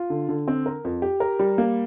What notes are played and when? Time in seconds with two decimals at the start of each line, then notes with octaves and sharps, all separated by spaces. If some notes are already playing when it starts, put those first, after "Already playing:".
Already playing: F4
0.10 D3
0.29 D3
0.48 C4
0.66 A#4
0.85 F2
1.02 G4
1.20 A#4
1.39 G3
1.58 A#3